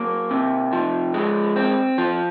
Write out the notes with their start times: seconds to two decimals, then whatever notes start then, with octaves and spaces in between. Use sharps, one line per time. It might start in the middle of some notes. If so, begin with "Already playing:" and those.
Already playing: F#3 A#3
0.31 C3
0.73 F3
1.14 G#3
1.56 C4
1.98 F3